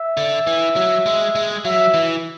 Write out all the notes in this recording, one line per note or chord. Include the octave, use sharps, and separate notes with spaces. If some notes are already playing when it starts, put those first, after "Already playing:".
Already playing: E5
D3
E3
F#3
G#3
G#3
F#3 E5
E3